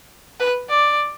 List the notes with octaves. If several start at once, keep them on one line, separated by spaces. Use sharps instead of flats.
B4
D5